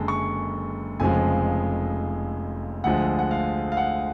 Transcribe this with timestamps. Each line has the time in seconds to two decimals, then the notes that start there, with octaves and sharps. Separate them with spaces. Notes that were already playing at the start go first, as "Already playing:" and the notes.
Already playing: F#1 F#2 D3 G#3 A5
0.08 C#6
1.00 F1 F2 C#3 F3 G#3 G#5
2.84 D2 D3 F3 G#3 F#5
3.19 F#5
3.31 F5
3.72 F5
3.77 F#5